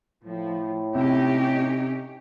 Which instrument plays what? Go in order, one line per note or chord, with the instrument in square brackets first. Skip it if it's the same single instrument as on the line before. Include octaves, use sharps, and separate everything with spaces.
[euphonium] A2 [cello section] F3
[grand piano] C3 [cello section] C#4 D#4 G4